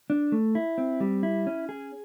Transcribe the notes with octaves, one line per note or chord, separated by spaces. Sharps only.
D4
A3
E4
C4
G3
E4
C#4
G#4